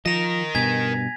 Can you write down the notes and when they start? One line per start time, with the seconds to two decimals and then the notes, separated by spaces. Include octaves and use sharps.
0.06 F3 A#4 D#5 A#6 F7
0.55 G2 B2 G#5 G#6 B6